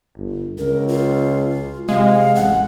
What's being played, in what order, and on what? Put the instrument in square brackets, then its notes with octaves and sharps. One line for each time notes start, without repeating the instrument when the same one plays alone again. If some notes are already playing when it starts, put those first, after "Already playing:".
[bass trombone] G1
[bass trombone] C#2 [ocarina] A#4
[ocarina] F4
[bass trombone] C3 [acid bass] G#3 [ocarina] F5
[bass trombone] A1 [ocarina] F#5